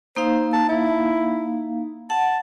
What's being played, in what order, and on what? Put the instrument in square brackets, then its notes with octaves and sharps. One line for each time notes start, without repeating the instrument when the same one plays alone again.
[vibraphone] A#3 D#4 F5 [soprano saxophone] C5
[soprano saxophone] A5
E4
[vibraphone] F#5 [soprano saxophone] A5